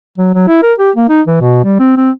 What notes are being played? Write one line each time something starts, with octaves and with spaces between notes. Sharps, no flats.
F#3
F#3
E4
A#4
G4
A#3
D#4
E3
B2
G3
C4
C4